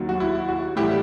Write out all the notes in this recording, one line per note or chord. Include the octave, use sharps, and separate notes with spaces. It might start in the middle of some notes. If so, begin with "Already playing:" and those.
Already playing: D#2 D#3 F#3
F#4
E4
F#4
A2 E3 G3 E4 G4